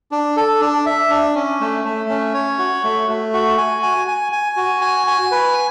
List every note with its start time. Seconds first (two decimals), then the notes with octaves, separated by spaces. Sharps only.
0.12 D4
0.36 A4
0.61 D4
0.86 E5
1.10 D4
1.35 C#4
1.60 A3
1.84 A3
2.09 C#4
2.34 C#5
2.59 F#4
2.84 A3
3.09 A3
3.33 F#4
3.58 G#5
3.83 G#5
4.08 G#5
4.32 G#5
4.57 F#4
4.81 G#5
5.07 G#5
5.31 B4